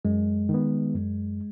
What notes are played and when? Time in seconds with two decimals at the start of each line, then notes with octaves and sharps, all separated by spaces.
0.05 F#2 G#3
0.49 D#3
0.54 B3
0.94 F#2